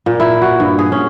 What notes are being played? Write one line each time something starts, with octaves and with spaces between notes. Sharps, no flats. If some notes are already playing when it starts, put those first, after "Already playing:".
A#2
E4
F#4
G2
G#4
C#4